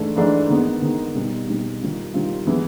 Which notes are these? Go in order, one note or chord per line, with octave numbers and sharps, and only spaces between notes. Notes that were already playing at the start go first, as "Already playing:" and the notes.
Already playing: G#2 E3 A3 D4
G#2 E3 A3 D4
D#3 G#3 B3
D#3 G#3 B3
B2 G3 C4 D#4
B2 G3 C4 D#4
D#3 G3 C4 F4
D#3 G3 C4 F4
E3 G#3 B3 E4